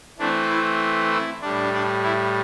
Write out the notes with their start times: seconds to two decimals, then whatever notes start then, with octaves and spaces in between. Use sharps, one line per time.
0.19 E3 A3 C4 D4
0.50 E4
1.11 E4
1.42 A2 G3 D4
1.73 D4
2.04 E4